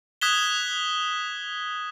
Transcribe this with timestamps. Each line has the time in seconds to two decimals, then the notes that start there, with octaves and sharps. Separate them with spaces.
0.21 D#6 F#6 G#6 B6 E7 G7